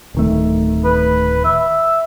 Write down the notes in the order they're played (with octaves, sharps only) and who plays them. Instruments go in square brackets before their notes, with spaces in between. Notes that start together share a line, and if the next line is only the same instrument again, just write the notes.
[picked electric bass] D1 D#3 A3
[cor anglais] B4
E5